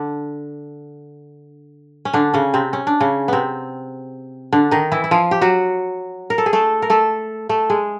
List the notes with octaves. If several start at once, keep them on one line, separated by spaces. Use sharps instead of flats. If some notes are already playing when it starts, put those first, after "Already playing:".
Already playing: D3 D4
C#4
D3 D4
C#3 C#4
C3 C4
C#4
D4
C#3 C#4
C3 B3 C4
D3 D4
D#3 D#4
E3 E4
E4
F3 F4
G4
F#3 F#4
A#4
A4
G#4
A3 A4
A#4
A3 A4
A3 A4
G#3 G#4